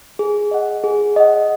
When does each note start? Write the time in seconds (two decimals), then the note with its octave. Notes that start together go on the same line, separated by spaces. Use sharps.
0.19 G#4
0.51 D#5 F#5
0.84 G#4
1.16 D#5 F#5